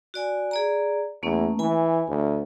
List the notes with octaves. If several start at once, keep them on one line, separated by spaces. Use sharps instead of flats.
F#4 D5 G#5
G#4 D5 A#5
E2 A3 A#3 C#4
E3 G#5 B5
D2